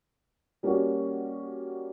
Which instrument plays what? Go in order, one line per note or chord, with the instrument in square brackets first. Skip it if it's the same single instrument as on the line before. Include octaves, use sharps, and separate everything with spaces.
[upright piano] G3 A#3 C#4 F#4